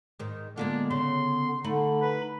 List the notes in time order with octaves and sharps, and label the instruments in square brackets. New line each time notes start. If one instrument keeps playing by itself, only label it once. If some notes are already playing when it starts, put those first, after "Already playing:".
[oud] G#2 D#3
[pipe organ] D3 B3 [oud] G#3 A#3 F4 [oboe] D4
[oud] C#3 [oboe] C6
[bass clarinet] D3 [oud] A3 [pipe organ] D#4 B5
[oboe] B4